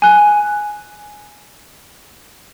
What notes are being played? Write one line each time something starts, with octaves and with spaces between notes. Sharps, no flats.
G#5 F#6